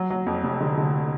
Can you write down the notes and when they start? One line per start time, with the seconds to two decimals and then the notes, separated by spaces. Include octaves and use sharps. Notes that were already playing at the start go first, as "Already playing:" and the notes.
Already playing: F#3
0.10 F#3
0.26 F2
0.44 F1
0.61 D3
0.77 D3